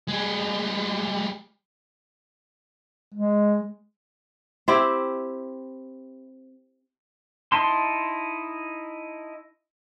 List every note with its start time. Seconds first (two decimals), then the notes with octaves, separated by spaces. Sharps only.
0.08 G3 G#3
3.14 G#3
4.68 C4 E4 G4
7.52 D#4 E4 A5 C6